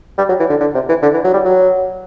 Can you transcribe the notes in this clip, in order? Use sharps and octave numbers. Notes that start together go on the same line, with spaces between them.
G3
F#3
E3
D3
D3
C3
E3
D3
E3
F#3
G3
F#3